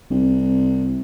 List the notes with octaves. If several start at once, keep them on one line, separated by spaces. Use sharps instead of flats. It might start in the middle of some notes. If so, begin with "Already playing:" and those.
C2